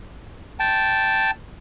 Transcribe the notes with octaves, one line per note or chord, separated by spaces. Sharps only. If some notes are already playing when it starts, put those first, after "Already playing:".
G5 A5